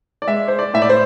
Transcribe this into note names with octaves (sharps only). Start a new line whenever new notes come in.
D5
G#3 E5
C5
D5
A2 E5
D5
C5